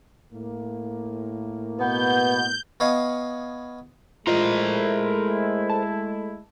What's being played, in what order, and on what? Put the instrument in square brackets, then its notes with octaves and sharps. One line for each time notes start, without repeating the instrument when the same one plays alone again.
[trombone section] A2 A#3
[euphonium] B2 [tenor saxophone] B3 [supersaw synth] G6
[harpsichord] B3 C#5 D#5 F5 G#5
[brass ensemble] G#3 A3 E4 [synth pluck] F4 D#5 [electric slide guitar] A#4 C5 A#5
[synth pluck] A5